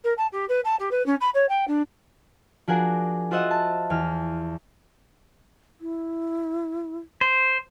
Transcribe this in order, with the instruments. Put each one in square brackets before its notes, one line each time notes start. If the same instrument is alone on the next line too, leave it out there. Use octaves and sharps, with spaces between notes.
[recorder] A#4
A5
G4
B4
A5
G4
B4
C#4
B5
C#5
G5
D4
[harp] F3 D4 F#4 G#4 A#4
F4 F#4 C5 D#5 E5 F#5
A5
E2 F6
[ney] E4
[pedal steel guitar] C5